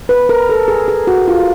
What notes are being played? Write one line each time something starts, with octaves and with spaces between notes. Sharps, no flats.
B4
A#4
A4
G#4
G#4
F#4
F4